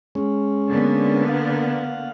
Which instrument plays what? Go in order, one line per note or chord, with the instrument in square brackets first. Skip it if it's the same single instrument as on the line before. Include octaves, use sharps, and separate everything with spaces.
[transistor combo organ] G#3 C#4
[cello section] D3 A#3 B3
[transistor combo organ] F5 F#5